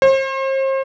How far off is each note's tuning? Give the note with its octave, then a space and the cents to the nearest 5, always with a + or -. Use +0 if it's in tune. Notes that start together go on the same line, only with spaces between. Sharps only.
C5 +40